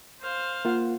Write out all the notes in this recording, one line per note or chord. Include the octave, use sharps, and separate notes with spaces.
C5 F5
A#3 F4 F#5